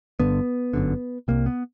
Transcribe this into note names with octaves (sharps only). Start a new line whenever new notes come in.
G1 G2 D3 B3
G1 F#2 D3
C2 C3 A#3
B3